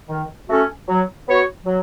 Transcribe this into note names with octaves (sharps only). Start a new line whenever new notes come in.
D#3
A3 C#4 F#4 A4
F#3
B3 F#4 C#5
F#3